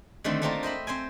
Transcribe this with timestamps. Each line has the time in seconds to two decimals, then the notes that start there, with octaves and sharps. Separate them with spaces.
0.24 D3 D#3 A3 C4
0.42 A3 A#3 C4 D4 F4 A#4
0.63 C5 D#5 E5 B5
0.87 C4 C5 G5 G#5